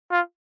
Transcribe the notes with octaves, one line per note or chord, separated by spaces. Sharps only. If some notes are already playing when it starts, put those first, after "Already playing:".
F4